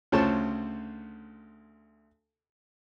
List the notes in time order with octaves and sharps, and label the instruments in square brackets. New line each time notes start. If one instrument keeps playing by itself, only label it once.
[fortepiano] D2 C#3 F4 C5 C#5 A5